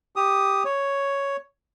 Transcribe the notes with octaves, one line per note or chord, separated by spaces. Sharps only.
G4 D#6
C#5